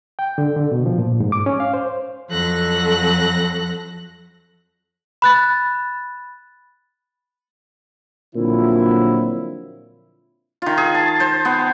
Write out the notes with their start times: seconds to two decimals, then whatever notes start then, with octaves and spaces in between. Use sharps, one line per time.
0.19 G5
0.38 D3
0.56 D3
0.72 B2
0.86 F3
0.99 A#2
1.20 G#2
1.32 D6
1.46 C#4
1.60 F5
1.74 C5
2.28 F2 F#3 A4 F#6 A#6
5.22 B5 F#6 A6
8.35 A#2 D3 F3 F#3 C4 E4
10.62 D#3 F4
10.77 G#4
10.95 A5
11.20 C5
11.45 B3